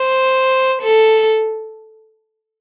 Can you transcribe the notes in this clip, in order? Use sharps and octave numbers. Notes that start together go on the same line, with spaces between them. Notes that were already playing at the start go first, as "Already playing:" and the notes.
Already playing: C5
A4